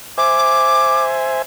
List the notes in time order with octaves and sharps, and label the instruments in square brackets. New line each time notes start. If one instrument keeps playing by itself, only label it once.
[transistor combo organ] C5 E5 G#5 [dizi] D6